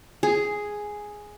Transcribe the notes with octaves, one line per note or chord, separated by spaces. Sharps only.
G#4